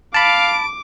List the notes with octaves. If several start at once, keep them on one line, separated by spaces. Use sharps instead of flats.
F5 A5 B5 D6 D7